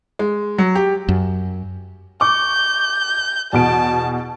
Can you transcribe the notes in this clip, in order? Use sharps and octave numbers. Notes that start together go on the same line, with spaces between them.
G#3
F#3
G4
F#2
C#6 D6 G6
E2 B2 A5 D7